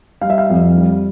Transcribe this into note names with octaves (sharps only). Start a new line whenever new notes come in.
G3 F5
E5
F5
F2
G3